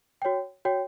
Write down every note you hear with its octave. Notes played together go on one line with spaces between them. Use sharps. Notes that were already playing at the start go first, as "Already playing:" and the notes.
F#4 C#5 G5
F#4 C#5 G5